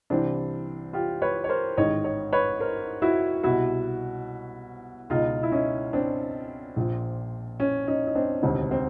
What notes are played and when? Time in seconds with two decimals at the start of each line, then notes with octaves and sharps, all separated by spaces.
0.10 C2 C3 E3 C4 D4
0.93 F4 G4
1.22 B4 C#5
1.44 C#5
1.49 A#4 C5
1.77 A1 G#2 D#3 C#5 D#5
2.04 C#5 D#5
2.33 B4 C#5
2.60 A#4 C5
3.02 E4 F#4
3.43 C2 B2 E4 F#4
5.10 C#2 B2 D#4 F4
5.43 E4
5.52 C#4 D#4
5.93 C4 D4
6.76 A#1 A#2 F3
7.60 C#4
7.88 C#4 D#4
8.07 D#4
8.15 C4 D4
8.43 E1 D2 C3 D#3 C4
8.71 C4